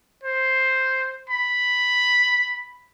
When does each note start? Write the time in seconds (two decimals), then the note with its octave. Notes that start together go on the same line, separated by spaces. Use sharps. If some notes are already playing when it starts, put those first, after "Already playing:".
0.23 C5
1.30 B5